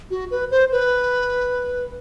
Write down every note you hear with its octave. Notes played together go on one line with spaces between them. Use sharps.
F#4
B4
C5
B4